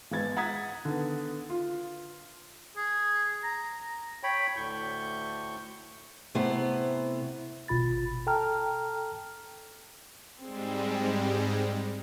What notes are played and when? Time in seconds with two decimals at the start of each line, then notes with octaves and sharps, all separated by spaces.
0.11 G#1 G#3 B3 G#6 A6
0.36 F#5 A#5 D#6 G#6 A6 B6
0.85 D3 D#3 B3
1.50 F4
2.77 G#4
3.44 A#5
4.23 C#5 G5 B5
4.56 D2 A2 C#6 G6
6.35 C3 A3 B3 E4 C5
7.68 G#1 B2 F4 B5 A6
8.27 A4 G5 A5 A#5 F6
10.43 G#2 G3 G#3 C4 G#4